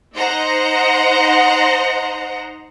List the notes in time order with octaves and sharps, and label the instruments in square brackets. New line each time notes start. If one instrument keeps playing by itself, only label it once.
[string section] D#4 C5 D#5 F#5 A#5